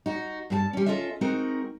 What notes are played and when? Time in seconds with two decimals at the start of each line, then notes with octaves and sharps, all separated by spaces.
0.06 D#4 F#4
0.50 G2 G4 A5
0.73 G3 C#4
0.86 C#4 D4 F4 A4 D#5 E5
1.21 G#3 C4 D#4 F#4 A#4